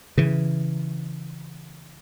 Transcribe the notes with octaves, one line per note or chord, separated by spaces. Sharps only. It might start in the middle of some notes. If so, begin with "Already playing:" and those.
C#3 E3